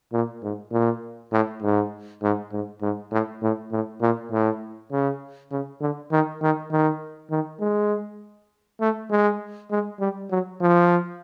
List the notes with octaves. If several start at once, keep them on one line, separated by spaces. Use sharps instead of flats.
A#2
G#2
A#2
A2
G#2
G#2
G#2
G#2
A2
A2
A2
A#2
A2
C#3
C#3
D3
D#3
D#3
D#3
D#3
G#3
A3
G#3
G#3
G3
F#3
F3